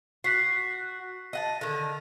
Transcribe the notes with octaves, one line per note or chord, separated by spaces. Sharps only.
F#4 F#6 B6 C7
D#5 F#5 A5
D3 D#3